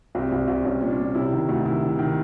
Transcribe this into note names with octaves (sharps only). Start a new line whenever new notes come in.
C2 C4
C2
C2
C2 C#4
A#2 C#4
D4
A#2
C3 E4
D#3
D2
D#3 E4
D#3
D#3